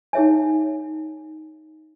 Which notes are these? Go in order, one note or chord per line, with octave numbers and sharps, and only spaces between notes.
D#4 G#4 C#5 E5 G#5